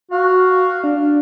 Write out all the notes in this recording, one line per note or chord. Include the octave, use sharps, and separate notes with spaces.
F#4 F5
D4